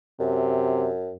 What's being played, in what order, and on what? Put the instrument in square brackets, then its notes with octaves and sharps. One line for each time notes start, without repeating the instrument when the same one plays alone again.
[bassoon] F#2 [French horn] C3